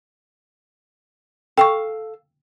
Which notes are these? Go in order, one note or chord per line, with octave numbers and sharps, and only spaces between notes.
A4 F5 G5 C#6